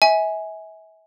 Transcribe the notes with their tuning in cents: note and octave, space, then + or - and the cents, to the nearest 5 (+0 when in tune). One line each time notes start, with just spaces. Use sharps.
E5 -35 G#5 +0